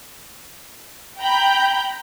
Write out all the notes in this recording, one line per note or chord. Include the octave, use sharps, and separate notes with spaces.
G5 A#5 B5 G6